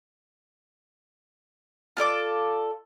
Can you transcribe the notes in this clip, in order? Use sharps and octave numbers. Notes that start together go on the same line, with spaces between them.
F4 A4 D5 D6